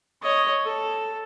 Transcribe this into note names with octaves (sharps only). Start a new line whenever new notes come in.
C#5 D#5
A4